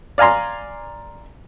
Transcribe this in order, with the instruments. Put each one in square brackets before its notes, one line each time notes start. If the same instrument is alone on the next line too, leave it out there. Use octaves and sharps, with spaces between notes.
[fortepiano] D5 F5 G#5 A#5 C6